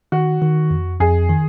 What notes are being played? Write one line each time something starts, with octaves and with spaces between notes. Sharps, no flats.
D#3 F#4
D#3
F2
F2 G#4
D#3